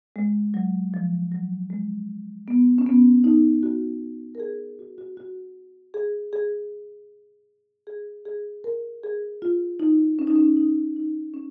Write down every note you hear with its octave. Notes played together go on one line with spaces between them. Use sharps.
G#3
F#3
F3
F#3
G#3
B3
C#4
B3
D#4
F#4
A#4
G#4
F#4
F#4
F#4
G#4
G#4
G#4
G#4
A#4
G#4
F4
D#4
C#4
D#4
C#4
D#4
D#4
C#4